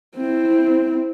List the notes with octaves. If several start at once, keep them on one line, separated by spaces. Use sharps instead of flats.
C4 E4